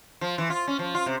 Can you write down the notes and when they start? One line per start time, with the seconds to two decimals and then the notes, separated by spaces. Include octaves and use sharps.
0.21 F3
0.38 E3
0.50 F4
0.67 C#4
0.79 F3
0.95 F4
1.06 C3